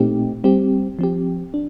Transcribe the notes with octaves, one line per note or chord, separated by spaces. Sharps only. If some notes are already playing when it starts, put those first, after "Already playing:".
Already playing: A#2 A3 C4 D#4 G4
G3 C4 G4
F3 C4 G4
D4